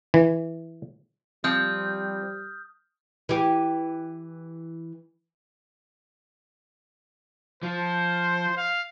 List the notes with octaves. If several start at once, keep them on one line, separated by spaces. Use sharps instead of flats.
E3
F3 G3 C4 D#6 F6 G6
E3 G4
F3 C5
F5